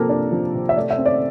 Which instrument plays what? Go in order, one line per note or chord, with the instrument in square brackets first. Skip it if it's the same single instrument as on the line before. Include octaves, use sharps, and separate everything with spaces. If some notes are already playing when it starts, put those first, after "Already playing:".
Already playing: [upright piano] C3 F3 A#3 A4 A#4
D4
F3
C3
E5
A3 D5
E5
C4
D5